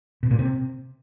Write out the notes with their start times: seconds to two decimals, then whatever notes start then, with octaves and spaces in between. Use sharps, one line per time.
0.23 B2
0.31 A#2
0.39 C3